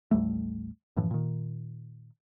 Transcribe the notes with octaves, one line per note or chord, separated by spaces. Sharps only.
A1 D#2 G3 A3
F#2 A2 E3 F3
A#2 D#3